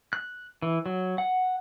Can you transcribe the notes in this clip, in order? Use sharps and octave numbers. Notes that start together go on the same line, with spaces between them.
F#6
E3
F#3
F#5